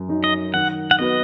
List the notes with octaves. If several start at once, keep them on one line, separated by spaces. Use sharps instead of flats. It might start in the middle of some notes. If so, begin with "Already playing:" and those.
Already playing: F#2
F#3 D#4
D#5
D#3 F#5
F#5
B3 F#4 B4 D#5